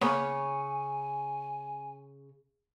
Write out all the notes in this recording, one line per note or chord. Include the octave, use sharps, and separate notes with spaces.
C#3 A#3 B3 C#5 G#5